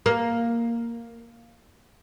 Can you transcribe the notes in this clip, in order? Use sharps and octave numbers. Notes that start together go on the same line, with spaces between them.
A#3